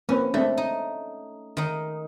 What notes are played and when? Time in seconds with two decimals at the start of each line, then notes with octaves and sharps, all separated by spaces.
0.09 A#3 C4 C#4 B4
0.34 A3 C4 D4
0.57 D#4
1.57 D#3 D#4